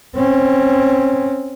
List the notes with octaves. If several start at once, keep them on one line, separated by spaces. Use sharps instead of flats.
C4 C#4